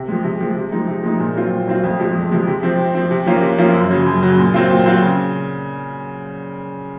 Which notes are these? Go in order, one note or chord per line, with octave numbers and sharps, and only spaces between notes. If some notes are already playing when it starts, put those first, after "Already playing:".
Already playing: C3
F3 G#3
C3
F3 G#3
C3
F3 G#3 D#4
C3
F3 G#3 D#4
A#2
F#3 C4 F4
A#2
F#3 C4 F4
F2
C3 F3 G#3
F2
C3 F3 G#3
C3
F3 C4
C3
F3 C4
C3
F3 A#3 C#4 F4
C3
F3 A#3 C#4 F4
F#2
C#3 F#3
F#2
C#3 F#3
A#2
F#3 C4 F4
A#2
F#3 C4 F4
C#3